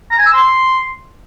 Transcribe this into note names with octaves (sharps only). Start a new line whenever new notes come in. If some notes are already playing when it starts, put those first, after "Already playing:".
A#5
G#5
E6
C6